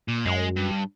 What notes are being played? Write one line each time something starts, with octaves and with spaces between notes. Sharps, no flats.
A#2
F#2 G#3
G2